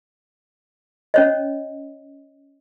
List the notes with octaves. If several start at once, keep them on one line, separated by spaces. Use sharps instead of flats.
C#4 C#5 D#5